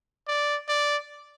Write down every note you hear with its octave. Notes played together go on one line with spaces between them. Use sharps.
D5
D5